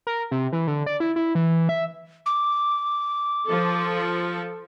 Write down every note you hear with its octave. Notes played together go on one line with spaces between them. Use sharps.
A#4
C3
E3
D3
D5
E4
E4
E3
E5
D6
F3 A4